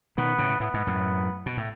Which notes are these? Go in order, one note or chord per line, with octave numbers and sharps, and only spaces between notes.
B2 D#3 B3
A2 C#3
A2 B3
G#2
F#2 A2
B2
A2